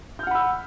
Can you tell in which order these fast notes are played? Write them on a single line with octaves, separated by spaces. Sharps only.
G6 F6 F#5 B5 E6